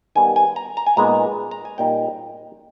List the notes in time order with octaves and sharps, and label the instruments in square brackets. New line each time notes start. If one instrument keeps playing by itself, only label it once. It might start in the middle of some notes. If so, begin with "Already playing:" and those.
[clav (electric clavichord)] D#3 G3 B3 G#5
G#5
A#5
A#5
G#5
A#2 G#3 B3 D#4 A#5
A#5
G#5
A#2 G3 A#3 D#4 G5